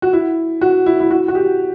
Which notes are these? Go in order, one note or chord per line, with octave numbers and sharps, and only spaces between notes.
F#4
E4
F#4
E4
E4
F#4
F#4
G4